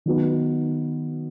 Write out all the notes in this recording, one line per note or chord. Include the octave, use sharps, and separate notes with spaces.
D#3 F#3 B3 D#4